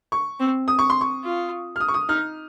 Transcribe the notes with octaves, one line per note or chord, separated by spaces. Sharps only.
C#6
C4
D#6
C#6
C6
C#6
F4
F6
D#6
C#6
D#6
D#4 F6